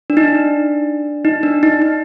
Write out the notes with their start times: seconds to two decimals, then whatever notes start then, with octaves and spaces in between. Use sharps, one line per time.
0.10 D4
0.17 D#4
0.24 D4
1.25 D#4
1.43 D4
1.63 D#4
1.82 D#4